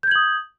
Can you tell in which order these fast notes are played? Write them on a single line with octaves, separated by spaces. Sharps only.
G6 G#6 F#7 D#6